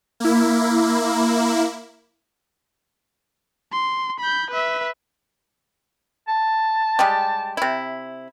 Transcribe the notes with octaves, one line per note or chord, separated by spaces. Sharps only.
A#3 E4
C6
B5 G6
B4 E5
A5
G3 G#3 G4
C3 E4